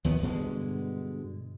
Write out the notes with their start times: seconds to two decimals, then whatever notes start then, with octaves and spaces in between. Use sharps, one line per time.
0.04 D#2 D#3 B3
0.23 G2 B2 D3 G#3